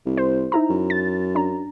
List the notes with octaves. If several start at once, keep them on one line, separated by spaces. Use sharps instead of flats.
C2
C5
D#4 E4 A#5
F#2
A6
D4 A#5